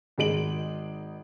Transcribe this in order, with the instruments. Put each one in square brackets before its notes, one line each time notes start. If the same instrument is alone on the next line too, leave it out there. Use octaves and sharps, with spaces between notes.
[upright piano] G#1 D#3 G#3 D7 F#7